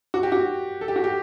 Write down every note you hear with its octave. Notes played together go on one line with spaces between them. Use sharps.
F#4
G4
F#4
A4
G4
F#4
G4